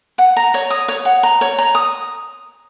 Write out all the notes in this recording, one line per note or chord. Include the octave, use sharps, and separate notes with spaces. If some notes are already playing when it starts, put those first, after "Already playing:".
F#5
A#5
C#5
D#6
C#5
F#5
A#5
C#5
A#5
D#6